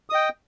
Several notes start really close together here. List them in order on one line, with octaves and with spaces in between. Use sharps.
D#6 D#5 G5